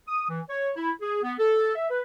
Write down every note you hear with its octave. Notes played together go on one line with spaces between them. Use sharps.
D#6
E3
C#5
E4
G#4
B3
A4
E5
B4